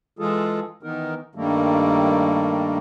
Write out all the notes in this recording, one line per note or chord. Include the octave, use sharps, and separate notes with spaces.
E3 G#3 F4 G#4 A4
D#3 E3 B3 D#4 A#4
G2 D#3 G3 A3 A#3